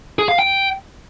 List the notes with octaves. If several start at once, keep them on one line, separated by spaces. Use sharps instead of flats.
G#4
F5
G5